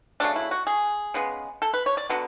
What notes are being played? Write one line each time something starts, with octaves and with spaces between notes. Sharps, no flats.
C#3 F#3 A3 D4
E4
F#4
G#4
C#3 G#3 B3
A4
B4
C#5
D5
D3 F#3 B3